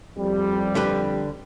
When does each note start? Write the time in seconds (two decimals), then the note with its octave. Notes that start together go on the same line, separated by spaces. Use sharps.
0.17 F2 G3
0.75 D3 G4 B4